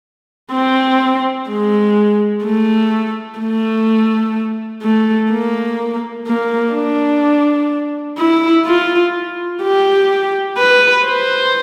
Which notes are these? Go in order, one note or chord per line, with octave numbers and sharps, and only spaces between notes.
C4
G#3
A3
A3
A3
A#3
A#3
D4
E4
F4
G4
B4
C5